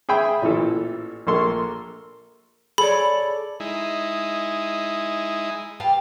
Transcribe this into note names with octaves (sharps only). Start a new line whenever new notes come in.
G#4 E5 G5 B5
A1 A#2 E3 A4
A#1 A#3 A4 C6 C#6
G#4 A4 C#5 D5 B5
G#3 D#4 E4
F4 G4 B4 A5